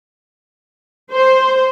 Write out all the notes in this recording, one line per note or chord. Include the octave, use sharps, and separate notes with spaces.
C5